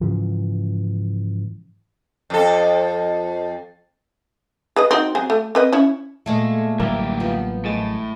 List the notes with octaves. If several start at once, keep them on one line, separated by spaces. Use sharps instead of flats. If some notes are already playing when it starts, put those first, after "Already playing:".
G#2 C#3 E3 F3
F2 A4
G#4 B4 D#5
C4 D#4 F#4
F#3 C4 G#4
A3
C4 B4 D#5
C#4 E4 C#5
A#2 G#3 A3
A1 D2 F#3 G3 A#3 E4 G4
F3 B3
A2 G#3 A6